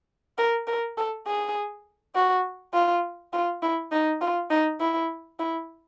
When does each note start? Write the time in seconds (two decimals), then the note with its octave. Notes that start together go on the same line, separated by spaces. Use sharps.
0.38 A#4
0.67 A#4
0.97 A4
1.27 G#4
2.15 F#4
2.74 F4
3.33 F4
3.62 E4
3.92 D#4
4.21 F4
4.51 D#4
4.80 E4
5.39 E4